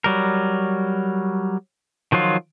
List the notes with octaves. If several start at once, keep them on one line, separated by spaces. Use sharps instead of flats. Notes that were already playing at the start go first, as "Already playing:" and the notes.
F#3 G3 A#4
D#3 F3 F#3 F4